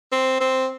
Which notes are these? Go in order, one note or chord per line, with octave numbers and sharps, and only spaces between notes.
C4
C4